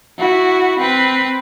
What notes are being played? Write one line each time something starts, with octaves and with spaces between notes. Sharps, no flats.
E4 F#4
C4 B4